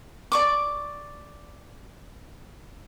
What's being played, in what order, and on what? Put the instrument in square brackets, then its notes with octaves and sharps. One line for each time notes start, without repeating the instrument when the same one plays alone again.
[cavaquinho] D5 C#6 D6